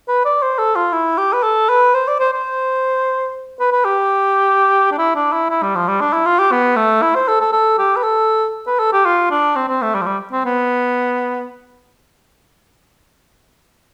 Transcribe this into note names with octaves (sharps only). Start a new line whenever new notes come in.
B4
D5
C5
A4
F4
E4
G4
B4
A4
B4
C5
D5
C5
C5
B4
B4
G4
D4
E4
D4
E4
E4
G3
F3
G3
D4
E4
F4
G4
B3
A3
E4
C5
A4
A4
A4
G4
B4
A4
B4
A4
G4
F4
D4
C4
C4
A3
G3
F3
G3
C4
B3